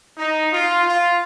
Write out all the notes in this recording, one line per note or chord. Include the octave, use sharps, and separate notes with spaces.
D#4
F4
F4